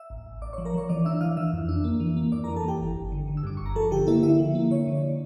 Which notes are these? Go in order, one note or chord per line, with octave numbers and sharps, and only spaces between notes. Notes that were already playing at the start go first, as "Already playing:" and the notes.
Already playing: E5 E6
A1
A1
A1 D5 D6
C#5 C#6
F3
A#4 A#5
F3 C#5 C#6
E3 D5 D6
D4 E5 E6
E3 F5 F6
E3 E5 E6
F2
D4
A#3
E3
A#3
F2 D5 D6
A#4 A#5
E3
A4 A5
E3 G4 G5
G1
G1
D3
D3
E6
G2 D6
G1 C#6
A#5
F3 A4 A5
D3 G4 G5
A#3 E4 E5
D3 E4 E5
F3
A#3
D3 C#5
D3
D5